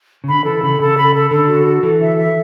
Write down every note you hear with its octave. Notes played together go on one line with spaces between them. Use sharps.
C#3
D3 B5
E3 A4
C#3 B5
C#3 A4
B5
A4
D3 A4
F#4
A4
E3 A4
E5
E5